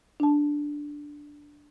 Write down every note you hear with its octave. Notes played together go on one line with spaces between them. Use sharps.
D4 A5